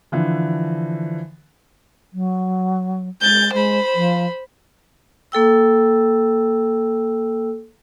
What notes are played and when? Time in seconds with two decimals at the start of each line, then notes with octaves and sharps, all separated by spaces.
0.12 D3 E3 F3
2.13 F#3
3.21 G#3 G6 A6
3.53 G#3 C5 B5
3.95 F3
5.32 A#3 A4 G5 E6